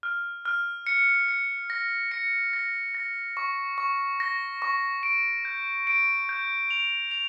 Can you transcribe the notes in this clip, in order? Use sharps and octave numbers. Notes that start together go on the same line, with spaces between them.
F6
F6
C#7
C#7
A#6
C#7
A#6
A#6
C#6
C#6
A#6
C#6
D7
G6
D7
G6
F7
F7